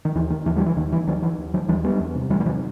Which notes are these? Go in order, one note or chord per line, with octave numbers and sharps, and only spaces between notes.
D#3
D#2 E3
D#3
D#2 E3
E3 G3
E3
D#2 D#3
E3
D#2 D#3 F#3
E3
D#2
D#3 F#3
D#2 E3 G3
G3 B3
E2
C3
E2 E3 G3
G3
C3 D#3 F#3